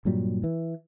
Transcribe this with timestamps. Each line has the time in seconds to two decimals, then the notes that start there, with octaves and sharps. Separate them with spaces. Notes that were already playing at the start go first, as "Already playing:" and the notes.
0.05 G2 A#2 F#3 G3
0.44 E3